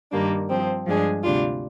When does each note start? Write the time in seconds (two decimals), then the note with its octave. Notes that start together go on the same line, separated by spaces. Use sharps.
0.11 G2 D#3 G3 A#3 D4
0.49 G2 F3 C4
0.86 G2 F3 G#3 D4 G#4
1.22 D2 C3 G3 D4 F4